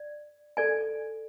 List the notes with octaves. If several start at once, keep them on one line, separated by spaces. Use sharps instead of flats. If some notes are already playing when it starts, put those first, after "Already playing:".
Already playing: D5
A4 D5 G#5